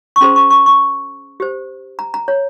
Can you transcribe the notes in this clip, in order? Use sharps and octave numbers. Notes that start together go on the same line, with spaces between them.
C#6
C#4 G#4 C5 C6
C#6
C#6
C#6
G4 C5
A#5
A#5
C#5